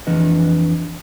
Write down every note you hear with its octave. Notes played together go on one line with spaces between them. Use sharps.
F2 E3 D4 B4 D#5